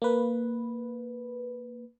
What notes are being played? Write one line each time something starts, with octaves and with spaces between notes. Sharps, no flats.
A#3 B4